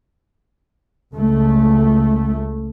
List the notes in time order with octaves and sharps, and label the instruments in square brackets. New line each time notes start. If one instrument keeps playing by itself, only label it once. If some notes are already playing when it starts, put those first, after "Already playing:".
[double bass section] C#2 A3